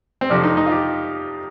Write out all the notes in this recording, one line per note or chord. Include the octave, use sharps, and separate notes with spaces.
C4
F2 C3 F3 D4
D#4
D#4
F4
G4